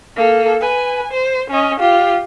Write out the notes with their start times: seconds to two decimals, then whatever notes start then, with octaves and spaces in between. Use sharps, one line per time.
0.16 A#3 A4
0.61 B4 G#5
1.12 C5
1.50 C#4 D#5
1.80 F4 G4